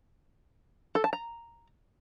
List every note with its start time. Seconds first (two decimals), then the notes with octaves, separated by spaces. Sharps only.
0.95 A4
1.04 A5
1.13 A#5